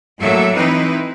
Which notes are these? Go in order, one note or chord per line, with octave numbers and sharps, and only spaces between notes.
A2 F#3 A#3 A4 E5
E3 C4 D#4 E4 B4